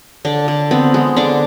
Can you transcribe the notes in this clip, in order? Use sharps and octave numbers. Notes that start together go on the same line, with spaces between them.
D3 D4
D3
B3 C4
G#3
D3 D4